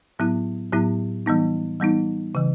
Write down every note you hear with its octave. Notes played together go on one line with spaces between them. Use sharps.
A2 F#3 B3 E4
A2 F#3 B3 E4
E3 G3 B3 D#4
E3 G3 B3 D#4
C#3 E3